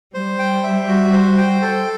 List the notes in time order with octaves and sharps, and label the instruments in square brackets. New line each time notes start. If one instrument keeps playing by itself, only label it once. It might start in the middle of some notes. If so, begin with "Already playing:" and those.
[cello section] G3 [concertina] C5
[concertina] G5
E5
F#4
C5
G5
A4